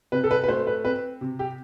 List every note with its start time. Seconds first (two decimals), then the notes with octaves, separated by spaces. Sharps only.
0.12 C3 B4
0.24 A4
0.31 B4
0.44 B4
0.48 A3 C5
0.67 B4
0.84 C4 B4
1.21 C3
1.39 G4